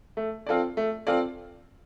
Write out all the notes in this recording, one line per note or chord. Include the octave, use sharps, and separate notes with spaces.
A3
C4 F4 A4 D5
A3
C4 F4 A4 D5